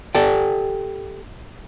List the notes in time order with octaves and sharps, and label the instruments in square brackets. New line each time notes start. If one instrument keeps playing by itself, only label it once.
[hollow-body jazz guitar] G4 A4 D5 G5